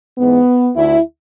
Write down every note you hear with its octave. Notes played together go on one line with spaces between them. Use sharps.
G#2 E3 B3
D2 D3 E4